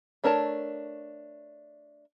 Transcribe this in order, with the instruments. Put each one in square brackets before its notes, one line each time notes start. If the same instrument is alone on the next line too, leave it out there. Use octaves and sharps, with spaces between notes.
[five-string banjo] A3 D4 A#4 C#5 A5